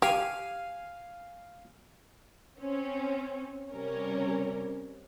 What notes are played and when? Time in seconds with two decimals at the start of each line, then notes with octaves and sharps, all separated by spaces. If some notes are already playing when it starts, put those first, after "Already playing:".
0.02 G4 F5 G#5
2.59 C4 C#4
3.73 C3 G3 C#4 A#4